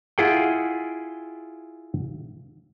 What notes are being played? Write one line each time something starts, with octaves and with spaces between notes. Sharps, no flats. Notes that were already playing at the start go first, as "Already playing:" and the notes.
E4 F4 G#4 F#5 G5